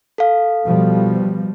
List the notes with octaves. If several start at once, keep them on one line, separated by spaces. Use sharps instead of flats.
A4 F5
B2 F3 G3